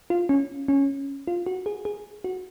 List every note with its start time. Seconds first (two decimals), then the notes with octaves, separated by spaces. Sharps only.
0.10 F4
0.29 C#4
0.68 C#4
1.28 F4
1.46 F#4
1.66 G#4
1.85 G#4
2.24 F#4